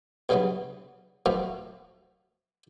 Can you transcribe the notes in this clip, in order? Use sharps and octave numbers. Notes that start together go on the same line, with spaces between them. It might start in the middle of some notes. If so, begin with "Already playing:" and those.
B1 G2 C#3 E3 F#3 B3
F#2 B2 F3 A3 F5